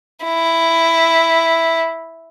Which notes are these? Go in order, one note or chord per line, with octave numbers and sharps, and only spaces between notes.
E4